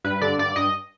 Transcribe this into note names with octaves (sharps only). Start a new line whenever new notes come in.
G2 B4
D3 D5
G2 D5
G2 D#5